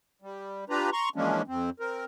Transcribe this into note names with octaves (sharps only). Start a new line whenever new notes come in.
G3
D4 F4 G4 B4 A#5
A#5 C6 C#6
E3 F3 G#3 A#3 C#4 D4
F2 C4
C4 A#4